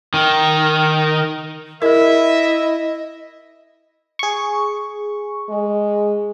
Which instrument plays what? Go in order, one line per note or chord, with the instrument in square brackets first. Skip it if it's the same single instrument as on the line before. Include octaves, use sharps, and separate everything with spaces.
[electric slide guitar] D#3
[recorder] E4 [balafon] G#4 A#4 [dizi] D#5 [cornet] E5
[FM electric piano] G#4 C#6
[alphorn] G#3